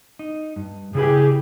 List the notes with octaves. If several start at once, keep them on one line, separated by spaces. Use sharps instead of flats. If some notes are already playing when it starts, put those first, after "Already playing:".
D#4
G2
C#3 E4 G4 G#4 B4